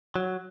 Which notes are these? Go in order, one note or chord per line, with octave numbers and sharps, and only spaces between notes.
F#3